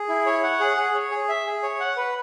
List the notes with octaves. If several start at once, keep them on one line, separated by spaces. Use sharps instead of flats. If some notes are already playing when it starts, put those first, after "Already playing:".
Already playing: G#4
E4
C#5
F#5
G#4
G#4
C#5
G#4
E5
G#4
C#5
F#5
B4